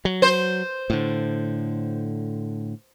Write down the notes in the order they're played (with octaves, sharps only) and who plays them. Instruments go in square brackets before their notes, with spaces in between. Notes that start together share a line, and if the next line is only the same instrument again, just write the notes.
[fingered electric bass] F#3
[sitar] C5
[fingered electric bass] A2 D3